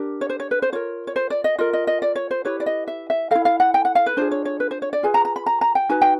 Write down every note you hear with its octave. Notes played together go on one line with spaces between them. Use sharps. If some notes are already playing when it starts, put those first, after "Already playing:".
Already playing: D4 G4 A#4
C#5
C5
C#5
B4
C5
F4 A#4 C#5
C#5
C5
D5
D#5
F4 A#4 D#5
D#5
D#5
D5
C#5
C5
E4 G4 B4 C#5
D5
D#5
E5
E5
E4 A4 F5
F5
F#5
G5
F#5
F5
B4
D4 F4 G#4 C5
C#5
C#5
B4
C5
C#5
D5
F4 G#4 B4 G#5
A#5
A#5
B5
A#5
A#5
G5
D#4 F#4 B4 G#5
G5